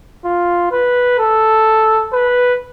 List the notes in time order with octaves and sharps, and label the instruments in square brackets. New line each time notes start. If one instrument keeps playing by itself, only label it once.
[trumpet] F4
B4
A4
B4